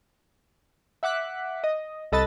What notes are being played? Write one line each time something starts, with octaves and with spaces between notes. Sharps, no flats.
E5 F#5 D6 F#6 B6
D#5
C2 A4 D#5 B5 F#6 A6